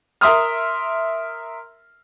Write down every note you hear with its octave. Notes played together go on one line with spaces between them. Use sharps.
A#4 E5 C6 D#6 F6